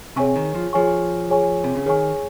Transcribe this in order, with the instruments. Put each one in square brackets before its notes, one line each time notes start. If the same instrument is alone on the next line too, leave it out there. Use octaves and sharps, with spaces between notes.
[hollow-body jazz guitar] C3 [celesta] G#4 C#5 G#5 C#6
[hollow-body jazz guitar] D#3
F3
[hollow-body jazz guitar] F3 [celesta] G#4 C#5 G#5 C#6
[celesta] G#4 C#5 G#5 C#6
[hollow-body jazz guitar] C3
C#3
[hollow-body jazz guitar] D#3 [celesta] G#4 C#5 G#5 C#6